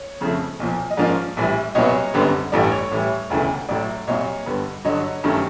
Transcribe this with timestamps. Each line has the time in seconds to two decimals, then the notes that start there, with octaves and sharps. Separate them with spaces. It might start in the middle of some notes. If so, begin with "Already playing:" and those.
Already playing: C#5
0.21 F2 C#3 F3 A3
0.60 B1 A#2 F3
0.90 D#5
0.97 G#2 F3 A#3 C#4 F4 D5
1.37 A#1 A2 E3 G3
1.75 C2 A#2 F#3 B3 C#5 D#5
2.14 G#1 F#2 D3 G3 B3
2.52 A1 G2 E3 A3 D5
2.72 C#5
2.91 A2 E3 G3
3.30 E1 D2 C#3 E3 A3
3.69 A1 A2 F#3 A3 D5
4.07 C2 A#2 F#3 C#5 D#5
4.46 G2 D3 G3 B3
4.85 G2 D3 F#3 C#5 D#5
5.24 G2 D#3 F#3 A3 C#4